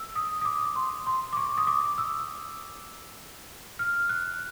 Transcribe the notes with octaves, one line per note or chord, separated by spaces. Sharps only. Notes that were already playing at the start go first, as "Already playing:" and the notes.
Already playing: E6
D#6
D#6
D6
C6
C6
D6
C#6
D#6
D6
E6
F6
F#6